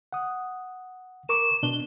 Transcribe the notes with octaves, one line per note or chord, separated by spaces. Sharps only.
F#5 D#6
A#4 C#6 D6 E7
B2 D4 G7